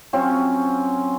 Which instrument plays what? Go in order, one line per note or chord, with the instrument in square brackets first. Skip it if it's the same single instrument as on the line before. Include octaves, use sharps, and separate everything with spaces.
[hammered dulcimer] F#3 C4 C#4 F4